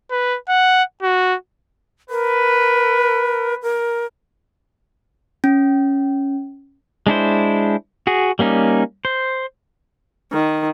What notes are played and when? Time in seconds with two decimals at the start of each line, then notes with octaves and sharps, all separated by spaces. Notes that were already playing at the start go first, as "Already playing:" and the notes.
0.11 B4
0.49 F#5
1.03 F#4
2.10 A#4 B4
3.62 A#4
5.44 C#4
7.07 G#3 D4 E4 C5
8.07 F#4 G#4
8.39 G3 A#3 C#4 D#4
9.05 C5
10.32 D#3